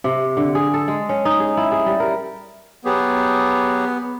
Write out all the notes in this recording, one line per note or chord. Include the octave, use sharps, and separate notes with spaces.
C3
D3
G#4
A4
G#3
C#4
D#4
G#4
E4
G#4
G3
A#4
F#3 B3 G4 G#4